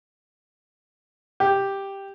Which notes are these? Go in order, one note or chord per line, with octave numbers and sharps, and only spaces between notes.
G4